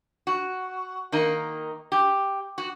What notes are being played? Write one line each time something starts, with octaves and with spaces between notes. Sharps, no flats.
F#4
D#3 A#3 D#4
G4
F#4